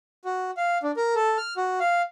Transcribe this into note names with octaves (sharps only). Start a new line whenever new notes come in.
F#4
F5
D4
A#4
A4
F6
F#4
F5